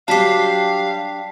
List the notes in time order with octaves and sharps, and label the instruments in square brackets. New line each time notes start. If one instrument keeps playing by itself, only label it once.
[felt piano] F#3 G3 [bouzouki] D4 G4 [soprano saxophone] F5 [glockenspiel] A5 B6 C7